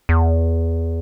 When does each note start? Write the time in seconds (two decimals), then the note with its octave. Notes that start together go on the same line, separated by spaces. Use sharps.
0.09 E2